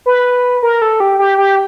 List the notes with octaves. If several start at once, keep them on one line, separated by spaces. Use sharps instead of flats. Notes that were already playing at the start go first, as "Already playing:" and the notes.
B4
A#4
A4
G4
G4
G4